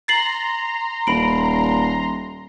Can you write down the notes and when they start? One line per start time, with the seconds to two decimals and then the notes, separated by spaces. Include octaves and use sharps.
0.08 A#5 C6 A6 C7 F#7
1.07 D#1 B5 D7